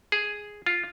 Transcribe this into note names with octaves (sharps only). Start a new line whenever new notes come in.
G#4
F4